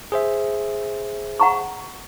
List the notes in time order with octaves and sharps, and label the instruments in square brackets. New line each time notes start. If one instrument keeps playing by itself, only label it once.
[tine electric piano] G#4 C5 E5
[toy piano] F#5 A#5 C#6